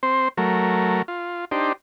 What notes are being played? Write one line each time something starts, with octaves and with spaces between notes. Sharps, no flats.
C4 C5
F#3 A3 A#4
F4
D4 D#4 G4 C5